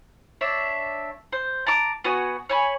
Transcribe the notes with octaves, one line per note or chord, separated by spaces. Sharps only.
D4 C#5 E5
C5
A5 A#5 D6
B3 F#4 G#5
C#5 G#5 B5